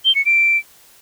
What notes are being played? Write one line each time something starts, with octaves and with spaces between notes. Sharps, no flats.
G7
C#7
D7